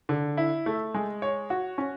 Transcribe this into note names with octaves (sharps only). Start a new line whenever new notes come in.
D3
E4
A3
G#3
C#5
F#4
C#4